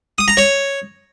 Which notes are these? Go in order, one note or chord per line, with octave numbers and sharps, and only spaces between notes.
D#6
A#5
C#5